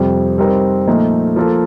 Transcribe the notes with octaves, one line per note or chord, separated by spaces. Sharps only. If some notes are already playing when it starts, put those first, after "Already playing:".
Already playing: F2 C3 G3
G3 C4 D#4 A#4
A#2 F3 A3 D#4
F3 A#3 F4 A4